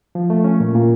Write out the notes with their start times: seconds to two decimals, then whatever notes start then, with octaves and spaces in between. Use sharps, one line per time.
0.15 F3
0.30 A3
0.44 C#4
0.60 A#2
0.75 A#2